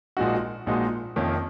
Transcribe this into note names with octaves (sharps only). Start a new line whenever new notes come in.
A#1 A#2 G#3 D#4 F#4
A#1 A#2 G#3 D#4 F#4
F1 F2 D#3 A#3 C#4